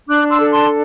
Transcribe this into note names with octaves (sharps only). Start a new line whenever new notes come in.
D4 D6 F#6
C6 E6
A4
A5 C6